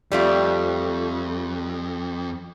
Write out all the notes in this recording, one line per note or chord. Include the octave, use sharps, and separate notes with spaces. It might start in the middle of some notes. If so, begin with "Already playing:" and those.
F2 G3 A3 F4